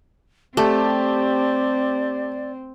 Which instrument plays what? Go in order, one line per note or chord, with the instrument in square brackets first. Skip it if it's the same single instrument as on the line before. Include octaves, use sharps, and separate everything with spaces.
[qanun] A3 [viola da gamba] C4 [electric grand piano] G4 A5 [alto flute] D5